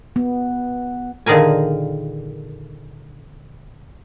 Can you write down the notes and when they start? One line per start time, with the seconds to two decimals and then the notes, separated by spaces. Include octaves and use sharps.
0.16 B3
1.26 A#2 D3 D#3 G#4 A#4 G#5